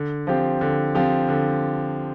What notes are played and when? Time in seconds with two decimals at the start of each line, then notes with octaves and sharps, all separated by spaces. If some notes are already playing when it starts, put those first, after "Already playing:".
Already playing: D3
0.27 F3 C4 G4
0.61 D3
0.95 F3 C4 G4
1.29 D3